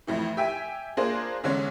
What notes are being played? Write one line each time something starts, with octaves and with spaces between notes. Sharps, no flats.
F2 A2 E3
G4 E5 G5 G#5
A#3 D4 F4 G#4 A#4 C5
E2 D3 G#3 C#4